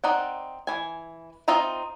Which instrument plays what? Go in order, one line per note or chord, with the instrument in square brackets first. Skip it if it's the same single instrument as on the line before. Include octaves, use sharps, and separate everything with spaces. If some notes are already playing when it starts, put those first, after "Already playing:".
[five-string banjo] C4 D#4 D5 F#5
E3 G#5
C4 D#4 F4 E5 A#5